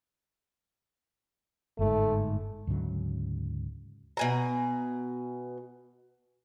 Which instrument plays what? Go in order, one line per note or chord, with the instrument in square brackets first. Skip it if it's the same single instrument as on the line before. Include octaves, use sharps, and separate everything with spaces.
[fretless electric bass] G1 G#2 [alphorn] A3
[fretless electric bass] D2 G#2 C#3 F#3
[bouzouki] B2 G#5 A#5